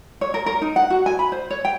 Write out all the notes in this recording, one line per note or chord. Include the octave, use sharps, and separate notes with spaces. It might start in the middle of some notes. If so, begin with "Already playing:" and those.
C#5
A#4
A#4
D#4
F#5
F#4
G#5
B5
C5
C#5
G5